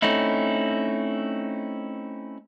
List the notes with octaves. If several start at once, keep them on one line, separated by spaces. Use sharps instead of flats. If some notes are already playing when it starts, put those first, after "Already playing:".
A3 C4 C#4 D#4 E4